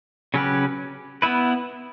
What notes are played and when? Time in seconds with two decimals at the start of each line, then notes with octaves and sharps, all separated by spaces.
0.34 C#3 F#3 C#4 G4 B4
1.22 B3 E4 B4